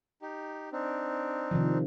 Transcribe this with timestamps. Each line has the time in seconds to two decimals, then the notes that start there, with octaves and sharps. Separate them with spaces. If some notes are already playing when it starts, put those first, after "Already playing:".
0.22 D#4 G4
0.72 C4 D4 D#4
1.51 C3 D#3 F3